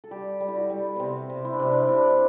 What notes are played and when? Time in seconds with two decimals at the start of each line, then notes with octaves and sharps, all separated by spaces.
0.04 A4
0.11 G3 G4
0.40 G3
0.48 E4
0.55 F#4
0.70 G3
0.96 C3 B3 C4
1.30 C3
1.45 E4
1.53 D4
1.59 C3 C4
1.71 D4
1.82 D4
1.89 C3 E4